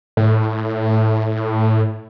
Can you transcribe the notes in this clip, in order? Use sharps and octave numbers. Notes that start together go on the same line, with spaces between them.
A2